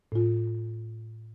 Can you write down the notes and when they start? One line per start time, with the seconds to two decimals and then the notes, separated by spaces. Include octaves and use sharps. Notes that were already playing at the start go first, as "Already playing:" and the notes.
0.12 A2 F4